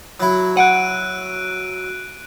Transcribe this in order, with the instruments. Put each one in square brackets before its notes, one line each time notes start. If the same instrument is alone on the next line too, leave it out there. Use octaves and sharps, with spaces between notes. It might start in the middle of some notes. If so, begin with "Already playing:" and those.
[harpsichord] F#3 E4
[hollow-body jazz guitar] F#5 [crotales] F#6 D7 D#7